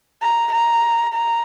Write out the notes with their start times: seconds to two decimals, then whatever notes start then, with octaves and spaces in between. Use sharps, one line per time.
0.22 A#5
0.52 A#5
1.14 A#5